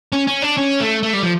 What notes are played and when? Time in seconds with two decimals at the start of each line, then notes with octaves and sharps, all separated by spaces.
0.13 C#4
0.27 C#4
0.43 D4
0.58 C#4
0.80 A3
1.03 A3
1.13 G3
1.23 F3